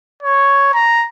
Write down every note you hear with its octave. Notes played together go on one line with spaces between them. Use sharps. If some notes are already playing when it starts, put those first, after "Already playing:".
C#5
A#5